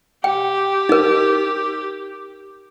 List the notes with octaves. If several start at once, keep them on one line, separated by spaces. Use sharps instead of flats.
G4 G5
D#4 A#4